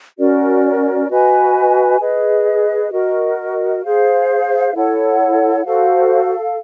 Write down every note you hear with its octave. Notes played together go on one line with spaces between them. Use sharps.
C#4 F#4 A#4 D5
F#4 B4 D#5 G#5
G#4 B4 D#5
F#4 A#4 D#5
G#4 C5 F5
E4 A4 C#5 F#5
F#4 A4 C5 F5